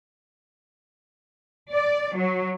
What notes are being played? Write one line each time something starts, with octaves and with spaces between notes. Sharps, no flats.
D5
F#3